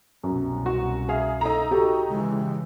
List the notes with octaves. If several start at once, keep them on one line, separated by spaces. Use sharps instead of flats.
C2 F#2 B2
F#4
G#4 E5 F5
D#4 A4 A#5
F#4 G4 A4 G5
C#3 E3 G#3